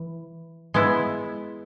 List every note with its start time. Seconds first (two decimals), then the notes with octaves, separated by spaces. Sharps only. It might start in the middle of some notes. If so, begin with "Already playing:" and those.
Already playing: E3
0.74 G#3 B3 E4